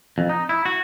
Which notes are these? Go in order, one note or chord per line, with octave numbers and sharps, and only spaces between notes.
F2
D#4
E4
F#4